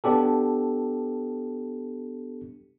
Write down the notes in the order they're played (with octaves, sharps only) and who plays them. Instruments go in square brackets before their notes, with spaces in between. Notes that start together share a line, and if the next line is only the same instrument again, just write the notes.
[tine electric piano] B3 D4 G4 A4